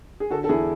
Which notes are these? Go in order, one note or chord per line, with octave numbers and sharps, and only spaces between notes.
G#4
D3 F#4 A4
A4
E2 E4 G#4